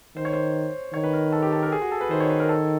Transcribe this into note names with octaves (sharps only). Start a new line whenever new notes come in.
D#3 C5
C#5
C5
D#3 C#5
B4
A#4
A4
G4
A4
A#4
G#4
F#4
A4
B4
D#3 C5
C#5
B4
A#4
A4